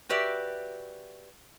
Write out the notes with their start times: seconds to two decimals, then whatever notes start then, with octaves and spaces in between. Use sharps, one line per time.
0.09 F#4 G4 B4 D5 E5